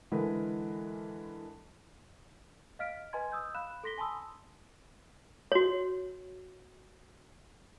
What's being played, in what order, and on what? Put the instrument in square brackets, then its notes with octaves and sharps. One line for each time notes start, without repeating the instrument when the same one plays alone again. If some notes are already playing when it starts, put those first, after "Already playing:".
[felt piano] D3 E3 G#3 A#4 B4
[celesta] D#5 F5 F6 B6 D7
B4 D#5 G#5 A#5 C6 G#6
D#6 E6 G6
F5 B5 F#6 E7
A4 C6 A#6 B6 G7
G#5 A5 B5 C6 D#6 E6
[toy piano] F#4 C#5